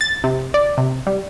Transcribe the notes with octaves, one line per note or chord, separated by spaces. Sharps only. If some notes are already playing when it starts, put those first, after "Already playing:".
A6
C3
D5
C3
G3